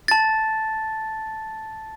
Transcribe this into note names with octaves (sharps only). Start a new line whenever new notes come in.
A5 A6